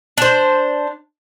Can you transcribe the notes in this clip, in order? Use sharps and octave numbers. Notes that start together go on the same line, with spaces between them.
D4 C5